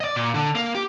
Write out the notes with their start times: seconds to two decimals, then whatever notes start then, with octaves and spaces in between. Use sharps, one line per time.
0.01 D5 D#5
0.16 A#2
0.34 D3
0.55 A#3
0.75 G4